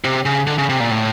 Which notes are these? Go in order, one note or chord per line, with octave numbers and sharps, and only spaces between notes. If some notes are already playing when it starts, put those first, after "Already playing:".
C3
C#3
D3
C#3
C3
A#2
A2